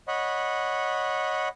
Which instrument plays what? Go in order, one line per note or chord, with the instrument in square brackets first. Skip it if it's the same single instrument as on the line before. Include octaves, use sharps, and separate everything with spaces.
[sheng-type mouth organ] C#5 D#5 F#5 B5